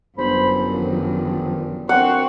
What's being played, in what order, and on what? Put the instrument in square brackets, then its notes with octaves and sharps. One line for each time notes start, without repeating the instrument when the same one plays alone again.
[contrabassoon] G1 [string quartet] F#2 [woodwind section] C5 B5
[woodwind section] A#2 D#3 F3
[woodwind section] F#2 D4 C#6 [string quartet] C4 [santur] F#5